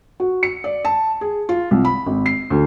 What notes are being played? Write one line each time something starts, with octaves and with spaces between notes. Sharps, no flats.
F#4
C#7
D5
A5
G#4
F4
C2
B5
G#1
C7
D2